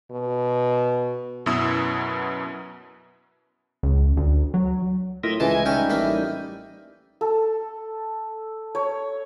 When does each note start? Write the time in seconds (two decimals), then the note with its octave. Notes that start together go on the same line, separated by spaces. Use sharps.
0.11 B2
1.46 F#2 B2 B3 E4 D#6 E6
3.83 C#2
4.17 D2
4.54 F#3
5.24 A2 F4 A#4 D#5 E5 A#6
5.40 C#2 E3 G#4 D#5 A5
5.51 G#6
5.66 G3 C#4 D#4 C#5 E5 G5
5.90 A1 A3 A#3 B5
7.21 A4
8.75 C#5